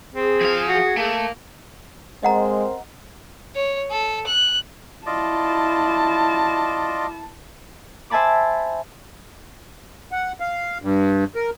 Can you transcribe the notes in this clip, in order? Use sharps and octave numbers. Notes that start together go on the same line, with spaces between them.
C4 G#4
F3 F5
F#4
A3 A#3
G#3 C4 A#4 C5 D#5 F#5 A#5
C#5
A4
F#6
E4 F4 D5 D#5 A5
C5 E5 G#5 A5 B5 D6
F#5
F5
G2
A#4